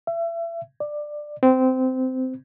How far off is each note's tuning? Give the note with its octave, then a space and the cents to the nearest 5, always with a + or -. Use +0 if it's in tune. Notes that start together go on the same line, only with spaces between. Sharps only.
E5 +30
D5 +15
C4 -20